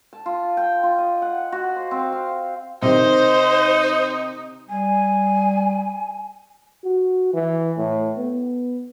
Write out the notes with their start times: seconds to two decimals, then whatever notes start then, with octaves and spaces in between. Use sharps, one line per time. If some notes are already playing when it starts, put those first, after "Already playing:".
0.13 A5
0.26 F4
0.57 G5
0.83 F4
0.98 D#5
1.22 F#5
1.52 F#4
1.76 C5
1.91 C4
2.12 F5
2.82 C3 D#3 D#4 C5
4.69 G3 G#5
6.84 F#4
7.33 E3
7.77 A2
8.17 B3